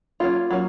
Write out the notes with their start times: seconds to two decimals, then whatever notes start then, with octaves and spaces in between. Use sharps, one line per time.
0.20 F#3 A#3 C#4 F4
0.51 F#3 A#3 C#4